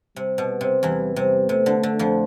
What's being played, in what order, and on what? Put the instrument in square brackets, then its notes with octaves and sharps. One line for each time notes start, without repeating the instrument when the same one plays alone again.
[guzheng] C3 [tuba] G3
[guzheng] B2
C3
[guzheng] E2 E3 [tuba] G3
[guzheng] C3 [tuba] G3
[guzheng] C3 [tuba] A3
[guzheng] D3
D3
F2 F3